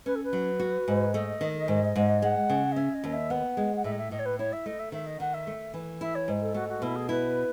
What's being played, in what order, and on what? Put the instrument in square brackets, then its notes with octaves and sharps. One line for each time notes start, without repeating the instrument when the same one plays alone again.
[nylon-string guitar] C#4 [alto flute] B4
[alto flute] A4
B4
[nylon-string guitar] F#3
F#4
G#2
[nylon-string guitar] A3 [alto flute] D#5
[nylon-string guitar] D#3
G#2
G#2
[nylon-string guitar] G#3 [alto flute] F#5
[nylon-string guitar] C#3
[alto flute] D#5
[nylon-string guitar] C#4 [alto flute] E5
[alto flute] D#5
[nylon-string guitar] D#2
[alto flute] E5
[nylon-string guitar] B3 [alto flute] F#5
[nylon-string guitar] G#3
[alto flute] F#5
[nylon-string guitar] A2 [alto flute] E5
[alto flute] D#5
E5
[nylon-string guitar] A2 [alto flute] D#5
[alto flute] C#5
B4
[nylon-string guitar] E4 [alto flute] C#5
[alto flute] E5
[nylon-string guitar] A3 [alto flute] D#5
[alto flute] E5
[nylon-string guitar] D#3 [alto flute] E5
[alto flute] D#5
[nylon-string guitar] D#3 [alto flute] F#5
[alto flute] E5
[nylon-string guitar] A3
E3
[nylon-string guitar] E4 [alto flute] E5
[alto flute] C#5
[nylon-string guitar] G#2
[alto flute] A4
[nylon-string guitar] A3 [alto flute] F#4
[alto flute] F#4
[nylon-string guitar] B2 [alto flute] E4
[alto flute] G#4
[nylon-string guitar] E4 [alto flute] B4